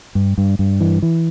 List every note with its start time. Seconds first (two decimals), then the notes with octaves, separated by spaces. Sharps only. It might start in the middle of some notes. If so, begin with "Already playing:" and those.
0.15 G2
0.38 G2
0.59 G2
0.80 E3
1.02 E3